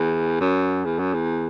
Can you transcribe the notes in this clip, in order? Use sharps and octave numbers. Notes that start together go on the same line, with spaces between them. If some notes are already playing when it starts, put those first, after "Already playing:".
Already playing: E2
F#2
E2
F#2
E2